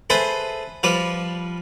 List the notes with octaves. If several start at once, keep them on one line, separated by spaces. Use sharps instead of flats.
G#4 A4 B4 C5 E5
F3 G3 B4 D5